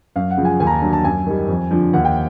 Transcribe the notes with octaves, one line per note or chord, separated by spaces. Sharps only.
F#2 F5
F#5
C#3 F3
G#5
D#2 G#5
A#5
A5
D3 F#3 A#5
A5
F#2 G#5
D#3 G3
F2
D3 F3
D#2 F#5
G5